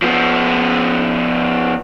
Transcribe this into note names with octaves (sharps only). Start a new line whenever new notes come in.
F3 B3